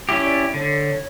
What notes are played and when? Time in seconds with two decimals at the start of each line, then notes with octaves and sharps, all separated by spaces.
0.09 C#4 E4 G4
0.24 D5
0.54 D3 C#5